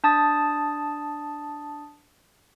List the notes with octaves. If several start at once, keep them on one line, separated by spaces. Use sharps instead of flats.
D4 A5 D#6 A6